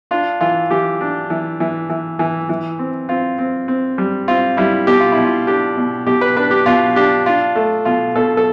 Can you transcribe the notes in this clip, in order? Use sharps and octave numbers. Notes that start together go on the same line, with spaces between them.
D4 F4
E3 F4
E3 G4
D4
E3
E3
E3
E3
E3
C4
C4 F4
C4
C4
G3
C4 F4
G3 E4
B2 G4
F4
E4
B2
F4
D4 G4
B2
B2 G4
B4
D4 B4
G4
B2 F4
D4 G4
D4 F4
A3
B2 F4
B2 A4
A4